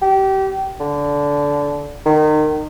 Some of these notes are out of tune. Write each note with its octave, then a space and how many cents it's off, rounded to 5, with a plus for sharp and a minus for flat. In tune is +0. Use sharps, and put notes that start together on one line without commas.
G4 -25
D3 -20
D#3 -30